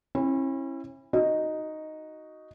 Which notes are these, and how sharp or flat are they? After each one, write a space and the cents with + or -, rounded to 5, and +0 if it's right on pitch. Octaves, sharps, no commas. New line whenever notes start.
C#4 -40 E4 +0
D#4 +0 F#4 +0 D#5 +0